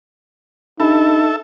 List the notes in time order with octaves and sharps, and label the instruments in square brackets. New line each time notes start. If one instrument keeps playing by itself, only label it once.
[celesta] D4 G4 B5 [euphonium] D#4 [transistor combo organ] A4 E5